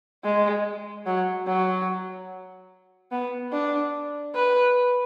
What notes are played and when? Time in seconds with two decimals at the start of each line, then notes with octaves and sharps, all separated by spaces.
0.24 G#3
1.06 F#3
1.47 F#3
3.12 B3
3.52 D4
4.35 B4